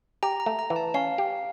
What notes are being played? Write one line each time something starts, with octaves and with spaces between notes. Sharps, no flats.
G4 A#5
A#5
A3
A#5
E3
A5
C#4 F5
G4